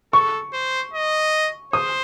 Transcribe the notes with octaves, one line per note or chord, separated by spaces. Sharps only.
A4 C#6
C5
D#5
C5 D#6